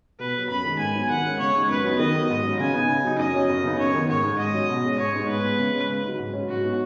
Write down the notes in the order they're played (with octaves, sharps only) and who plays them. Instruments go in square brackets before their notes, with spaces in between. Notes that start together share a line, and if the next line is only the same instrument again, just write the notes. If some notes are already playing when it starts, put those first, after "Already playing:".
[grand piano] B2 [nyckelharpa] B4
[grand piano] F#3 B3
[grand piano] F#2 [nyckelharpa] B5
[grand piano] D#3 G#3
[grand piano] G#2 [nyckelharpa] G#5
[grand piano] F#3 B3 D#4
[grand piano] D#3 [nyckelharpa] F#5
[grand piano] G#3 C#4
[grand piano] C#3 [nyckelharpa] C#5
[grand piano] G#3 D#4
[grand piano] F#2 [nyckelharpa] B4
[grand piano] F#3 B3 D#4
[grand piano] D#3 [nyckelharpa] D#5
[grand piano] F#3 B3 D#4
G#2
F#3 C#4
[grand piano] C#3 [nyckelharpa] G#5
[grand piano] B3 D#4
C#3
F#3 D#4
[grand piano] F#2 [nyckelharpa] D#5
[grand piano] F#3 C#4
F#2
C#3 B3 D#4
[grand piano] F#2 [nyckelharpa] C#5
[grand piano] D#3 B3
[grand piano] G#2 [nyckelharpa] C#5
[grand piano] G#3 D#4
[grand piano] G#2 [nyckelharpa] D#5
[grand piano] F#3 C#4
B2
G#3 C#4
[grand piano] G#2 [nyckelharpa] C#5
[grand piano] G#3 B3 D#4
[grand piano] G#2 [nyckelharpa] B4
[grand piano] G#3 B3
C#3
G#3 C#4
C#3
F#3 D#4
G#2
F#3 C#4
[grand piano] G#2 [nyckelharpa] F#4
[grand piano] F#3 B3 D#4